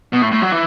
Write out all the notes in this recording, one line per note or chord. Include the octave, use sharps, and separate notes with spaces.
B2
A2
A2
F#3
E3